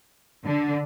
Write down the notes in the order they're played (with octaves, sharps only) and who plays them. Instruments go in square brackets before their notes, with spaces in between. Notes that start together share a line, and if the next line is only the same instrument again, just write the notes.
[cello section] D3